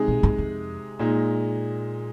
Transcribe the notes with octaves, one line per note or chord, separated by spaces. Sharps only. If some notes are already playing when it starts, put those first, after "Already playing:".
Already playing: C3 G#3 D#4 G#4
A#2
G#2
F2
A#2 G#3 D#4